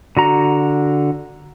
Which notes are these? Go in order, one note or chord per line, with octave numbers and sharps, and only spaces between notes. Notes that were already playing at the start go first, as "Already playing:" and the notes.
D3 F#4 A#5